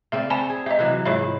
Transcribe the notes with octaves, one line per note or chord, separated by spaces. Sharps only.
C#3 C4 D5 E5
C4 G#5 A5 B5
G#4
D#4 G4 D#5 E5
C3 E3 F#3
G#2 E4 F4 C#5 E5